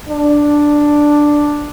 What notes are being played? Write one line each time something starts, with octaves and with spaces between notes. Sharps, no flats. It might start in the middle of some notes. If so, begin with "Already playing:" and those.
D4